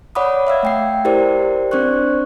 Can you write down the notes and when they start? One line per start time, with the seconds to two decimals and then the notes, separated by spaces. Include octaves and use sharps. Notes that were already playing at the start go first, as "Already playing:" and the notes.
0.15 C#5 D5 F#5 B5 D6 D#6
0.47 E5 F5 E6 G#6
0.63 A3 G5 C7
1.05 E4 G4 A#4 C5 D5
1.71 C4 D4 C5 D5 C#6 F#6